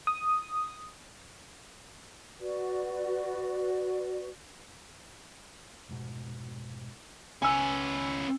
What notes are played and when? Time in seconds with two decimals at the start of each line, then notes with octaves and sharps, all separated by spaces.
0.07 D#6
2.40 F#4 B4 D5
5.89 F1 G#2 B2
7.42 C#2 C#4 B4 G#5 E6